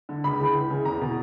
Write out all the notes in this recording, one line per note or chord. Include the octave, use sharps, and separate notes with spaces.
D3
C#2 B5
C#3 E3
C#2
C#3 E3
E2 A#5
B2